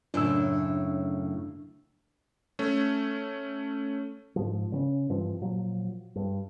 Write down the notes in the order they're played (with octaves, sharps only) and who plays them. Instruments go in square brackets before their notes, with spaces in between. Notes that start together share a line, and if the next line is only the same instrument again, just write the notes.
[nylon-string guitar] F#2 A2 C#3 [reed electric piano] D4 E6
[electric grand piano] A3 C#4
[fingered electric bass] G#2 F3
C#3 C4 C#4
G2 E3 F3 C4
A#2 F3 F#3
G2